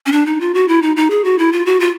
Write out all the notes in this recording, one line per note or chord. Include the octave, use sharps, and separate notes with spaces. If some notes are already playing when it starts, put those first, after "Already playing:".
C#4
D4
D#4
F4
F#4
E4
D#4
D#4
G#4
F#4
E4
F4
F#4
F4